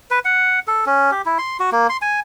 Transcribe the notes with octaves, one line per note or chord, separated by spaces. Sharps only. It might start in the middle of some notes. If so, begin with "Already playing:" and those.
B4
F#5
A4
C#4
G4
E4
C6
F#4
A#3
C6
G#5